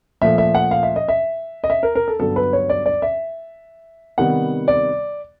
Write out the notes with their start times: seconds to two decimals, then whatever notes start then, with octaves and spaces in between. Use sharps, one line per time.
0.22 A#2 F3 A3 E5
0.38 E5
0.55 F#5
0.71 F5
0.83 E5
0.96 D#5
1.08 E5
1.64 D#5
1.70 E5
1.83 A#4
1.95 A#4
2.08 A4
2.20 G2 D3 F#3 B3 A4
2.36 B4
2.53 C#5
2.69 D5
2.86 D5
3.02 E5
4.18 C3 D#3 G3 B3 F#5
4.68 D5